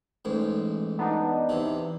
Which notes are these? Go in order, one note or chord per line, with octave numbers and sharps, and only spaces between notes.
A1 G#2
B3 D4 D#4
E2 C3